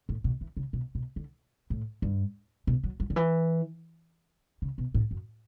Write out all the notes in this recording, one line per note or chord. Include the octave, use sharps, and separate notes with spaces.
A2
B2
E3
C#3
B2
B2
D3
A2
G2
B2
F#3
F#3
D3
E3
C#3
B2
A2
F#2